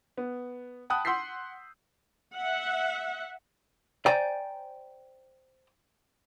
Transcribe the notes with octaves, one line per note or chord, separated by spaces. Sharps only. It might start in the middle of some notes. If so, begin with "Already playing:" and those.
B3
F#5 G5 A5 B5 D#6 F#6
F#5 C6 E6 G6 B6 C7
E5 F#5
C5 D5 G5 G#5 A#5